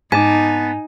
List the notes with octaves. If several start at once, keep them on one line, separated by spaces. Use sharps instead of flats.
G#2 B3 D#4 G#5 A5 D6